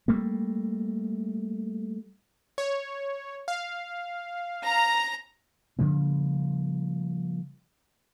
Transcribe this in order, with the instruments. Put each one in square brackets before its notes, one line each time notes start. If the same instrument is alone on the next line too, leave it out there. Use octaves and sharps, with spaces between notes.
[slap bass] G3 A3 A#3
[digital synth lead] C#5
F5
[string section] A#5
[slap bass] C#3 F3 G3 A#3